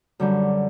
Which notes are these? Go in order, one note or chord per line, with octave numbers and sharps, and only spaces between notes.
F#2 D3 G3